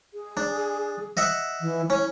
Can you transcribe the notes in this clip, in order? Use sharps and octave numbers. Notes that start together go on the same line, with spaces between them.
G#4
D4
D#5 E5 F#5
E3
C#4 E4